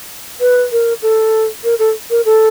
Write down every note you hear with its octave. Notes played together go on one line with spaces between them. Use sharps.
B4
A#4
A4
A#4
A4
A#4
A4